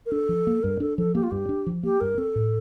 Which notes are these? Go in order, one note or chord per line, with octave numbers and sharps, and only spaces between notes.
A#4
D4 A4
F3
A#3
G2 A#4
D4 A4
F3 A4
A#3 G4
F4
G2 G4
D4
F3
A#3 G4
G2 A#4
C4 A4
A2